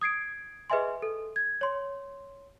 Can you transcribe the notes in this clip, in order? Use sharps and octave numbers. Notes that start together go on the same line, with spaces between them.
D#6 G#6 C7 D7
G#4 B4 D#5 E5 G#5 C6
A4
G#6
C#5 C6